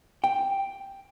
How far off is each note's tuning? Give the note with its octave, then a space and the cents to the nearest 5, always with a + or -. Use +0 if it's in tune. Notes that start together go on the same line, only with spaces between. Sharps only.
G5 +0